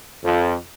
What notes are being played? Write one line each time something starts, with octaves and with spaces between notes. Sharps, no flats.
F2